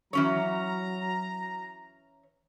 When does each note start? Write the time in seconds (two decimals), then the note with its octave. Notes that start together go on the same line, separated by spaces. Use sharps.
0.13 E3 F#3 C#4 C#5 A#5